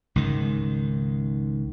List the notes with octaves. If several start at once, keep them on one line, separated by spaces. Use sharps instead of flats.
C#2 G#2 D#3